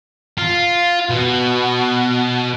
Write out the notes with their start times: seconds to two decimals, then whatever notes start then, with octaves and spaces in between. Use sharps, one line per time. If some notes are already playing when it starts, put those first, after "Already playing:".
0.38 F4
1.10 B2